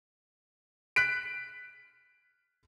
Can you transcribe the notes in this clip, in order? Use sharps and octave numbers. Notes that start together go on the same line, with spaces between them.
F#6 B6 D7